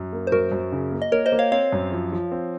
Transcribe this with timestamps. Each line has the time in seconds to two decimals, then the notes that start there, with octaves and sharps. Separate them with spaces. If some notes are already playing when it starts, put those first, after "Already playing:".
Already playing: F#2
0.13 A#3
0.27 C5
0.32 F#2 F#4 A#4
0.52 F#2
0.72 C#3
0.92 A#3
1.02 D#5
1.12 A#3 A#4 C#5
1.26 C5 D#5
1.32 A#3
1.39 C#5 F5
1.52 C4 C#5 F5
1.72 F#2
1.92 F3
2.12 F3
2.32 C4